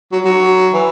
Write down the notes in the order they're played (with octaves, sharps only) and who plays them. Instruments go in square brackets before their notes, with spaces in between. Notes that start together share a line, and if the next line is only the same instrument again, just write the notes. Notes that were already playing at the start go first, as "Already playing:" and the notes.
[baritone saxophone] F#3
F#3
E3